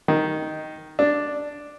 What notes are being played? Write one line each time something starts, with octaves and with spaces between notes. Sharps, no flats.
D#3
D4